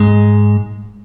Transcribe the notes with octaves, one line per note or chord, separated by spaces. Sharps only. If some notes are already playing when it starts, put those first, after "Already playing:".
Already playing: G#2 G#3